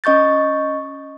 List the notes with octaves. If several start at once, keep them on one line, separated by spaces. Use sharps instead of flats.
C#4 D#5 C#6 G6 A6